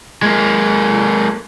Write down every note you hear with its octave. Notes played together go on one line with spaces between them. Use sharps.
G#3 A#3